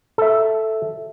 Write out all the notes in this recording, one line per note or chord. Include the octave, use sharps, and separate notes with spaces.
A4 E5